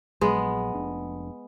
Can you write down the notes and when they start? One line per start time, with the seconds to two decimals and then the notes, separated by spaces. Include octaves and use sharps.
0.21 A#1 A#2 F#3 G#3 B3
0.74 F1 D4